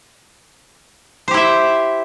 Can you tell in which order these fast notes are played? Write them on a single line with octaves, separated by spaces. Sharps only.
C5 G4 E4 E5